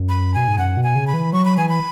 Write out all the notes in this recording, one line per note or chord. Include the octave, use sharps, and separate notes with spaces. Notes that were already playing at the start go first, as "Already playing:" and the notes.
Already playing: F#2
B5
B2 G#5
G#2
F#2 F#5
B2
G#5
C#3
B5
E3
F#3 C#6
B5
E3 G#5
B5